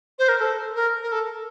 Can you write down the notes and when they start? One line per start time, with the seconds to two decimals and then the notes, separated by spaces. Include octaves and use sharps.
0.19 C5
0.29 A#4
0.39 A4
0.76 A#4
1.02 A#4
1.12 A4